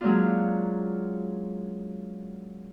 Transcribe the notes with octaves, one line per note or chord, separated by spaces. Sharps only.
F#3 G#3 A#3 C#4 D4 F4